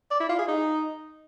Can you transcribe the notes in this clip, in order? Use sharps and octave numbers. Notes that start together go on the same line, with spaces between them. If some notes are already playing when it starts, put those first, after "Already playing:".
D5
E4
F4
G#4
D#4